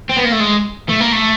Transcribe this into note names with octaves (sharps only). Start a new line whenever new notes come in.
C4
B3
A#3
A3
G#3
A3
A#3
A3